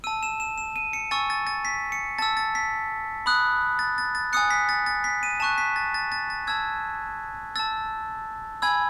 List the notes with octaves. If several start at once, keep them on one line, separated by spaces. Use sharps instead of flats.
A5 E6 D#7
E7
E7
E7
D#7
C#7
G#5 C#6 E6 A6
A6
A6
B6
C#7
A5 E6 A6
A6
B6
B5 D#6 F#6
A6
A6
A6
G#5 D#6 F#6 C#7
B6
A6
A6
B6
D#7
A5 C#6 F#6 E7
B6
A6
A6
A6
A6
A5 E6 G#6
A5 E6 A6
G#5 B5 E6 G#6